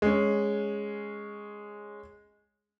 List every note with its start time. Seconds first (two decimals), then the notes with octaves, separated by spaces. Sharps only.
0.02 G#3 C#4